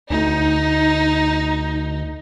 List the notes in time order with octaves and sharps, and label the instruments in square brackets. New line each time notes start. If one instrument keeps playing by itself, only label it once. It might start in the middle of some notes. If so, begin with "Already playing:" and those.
[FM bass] D2 [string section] D#4